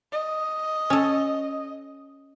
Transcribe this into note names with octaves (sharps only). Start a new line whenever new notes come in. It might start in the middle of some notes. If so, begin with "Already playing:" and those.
D#5
C#4 A4